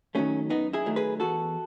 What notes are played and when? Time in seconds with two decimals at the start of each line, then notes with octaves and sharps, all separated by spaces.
0.15 D#3 F#3 A3 C#4
0.50 F#2 B3 D#4
0.73 E4 G#4
0.85 D#3 F#3 A3
0.96 G#4 B4
1.20 E2 F#4 A4